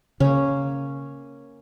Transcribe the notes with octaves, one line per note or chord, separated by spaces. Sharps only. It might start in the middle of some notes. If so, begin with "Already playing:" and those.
C#3 A#3 C#4